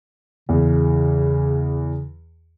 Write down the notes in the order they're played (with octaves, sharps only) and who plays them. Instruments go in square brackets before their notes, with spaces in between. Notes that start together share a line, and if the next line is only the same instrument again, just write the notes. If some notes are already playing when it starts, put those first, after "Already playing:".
[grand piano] E2 [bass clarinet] C#3